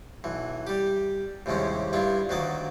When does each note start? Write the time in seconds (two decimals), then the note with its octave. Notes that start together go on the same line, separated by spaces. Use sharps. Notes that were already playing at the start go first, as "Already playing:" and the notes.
0.24 B1 E3
0.67 G3 G4
1.46 D#2 A2 C3 G3 G#3 C#4
1.93 G2 G3 E4 F4
2.29 D2 D#3 F#3 A#3 D5 D#6